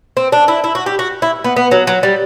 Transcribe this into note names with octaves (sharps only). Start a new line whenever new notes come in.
C4
D4
E4
E4
F#4
G4
F#4
E4
B3
B3
F#3
F#3
G3